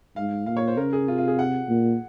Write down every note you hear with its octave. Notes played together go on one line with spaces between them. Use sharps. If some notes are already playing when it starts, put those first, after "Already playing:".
G#2 F5
A#2 F5
C#5
C5
C#3 A#4
G#4
C3 F4
F4
G#4
F#5
A#2